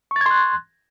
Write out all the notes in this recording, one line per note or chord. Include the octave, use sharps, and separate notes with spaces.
C6 C#6 F#6 G#6 A6